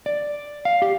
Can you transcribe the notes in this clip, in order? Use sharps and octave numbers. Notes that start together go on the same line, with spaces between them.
D5
F5
G4